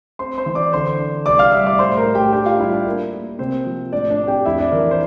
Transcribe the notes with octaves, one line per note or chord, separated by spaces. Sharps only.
C4 C5 C6
C5 C6
E3
D5 D6
D3 C5 C6
D4
C2 D5 D6
F5 F6
G3 E5 E6
D5 D6
A2 C5 C6
A#4 A#5
A2
G4 G5
D4 G4 G5
F4 F5
G3 E4 E5
D4 D5
A#3 A#4
A#3
C3 C4 C5
F3
A2 D4 D5
D4 D5
C4
G4 G5
F2 E4 E5
D4 D5
E3 A#4
C5